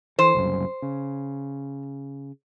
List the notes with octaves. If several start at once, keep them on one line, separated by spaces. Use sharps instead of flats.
E3 C5
F#1 C2 F#2
C#3